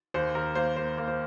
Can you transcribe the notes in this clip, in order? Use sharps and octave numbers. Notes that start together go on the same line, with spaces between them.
D#2 C5
D#2 A#4
A#3 C5
A#3 C5
A#3
C5